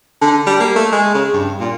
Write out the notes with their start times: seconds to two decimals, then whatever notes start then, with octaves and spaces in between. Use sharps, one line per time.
0.21 D3
0.47 G3
0.60 A#3
0.76 A3
0.92 G#3
1.15 C#3
1.34 G2
1.60 A#2